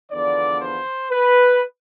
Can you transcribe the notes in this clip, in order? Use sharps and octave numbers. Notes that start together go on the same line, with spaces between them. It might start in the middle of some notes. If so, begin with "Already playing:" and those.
E2 D3 F3 B3 D5
C5
B4